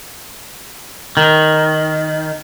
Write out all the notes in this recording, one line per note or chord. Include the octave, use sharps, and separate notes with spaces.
D#3